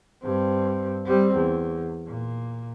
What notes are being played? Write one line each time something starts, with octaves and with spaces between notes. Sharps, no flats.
G2 C4
G3 C4
E2
A#2